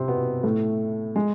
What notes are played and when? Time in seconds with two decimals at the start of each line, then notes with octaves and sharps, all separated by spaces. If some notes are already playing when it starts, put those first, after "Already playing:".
Already playing: C3 C4
0.08 B2 B3
0.43 A2 A3
1.16 G#3